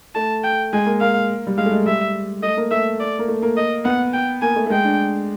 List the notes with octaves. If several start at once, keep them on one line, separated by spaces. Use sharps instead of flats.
A3 A5
G5
G#3 G#5
A#3
A#3 F5
G3
G#3 F5
A3
G#3
G3 E5
A3 D#5
A#3
A3 E5
D5
A#3
A3
A#3
D#5
B3 F#5
G5
A#3 G#5
A3
A3
G#3 G5
D4